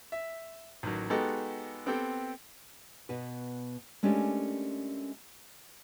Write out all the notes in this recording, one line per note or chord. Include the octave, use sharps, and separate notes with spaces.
E5
A1 D#3 F#3
G#3 B3 D#4 F#4 G4 A4
B3 C4 G4 A4 G5
B2 B3 B4
G#3 A3 C#4 D4 G4 A#4